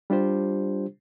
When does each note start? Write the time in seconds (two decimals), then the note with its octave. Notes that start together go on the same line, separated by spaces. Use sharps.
0.10 G3 D4 F4 G4 C5